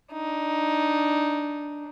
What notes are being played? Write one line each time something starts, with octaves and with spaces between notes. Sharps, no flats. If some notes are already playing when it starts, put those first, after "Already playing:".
D4 D#4